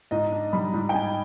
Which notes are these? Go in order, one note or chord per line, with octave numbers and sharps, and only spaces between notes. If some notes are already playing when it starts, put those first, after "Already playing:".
G#2 D#5
D4
G3 B5
G#2
G5
G#2 G#5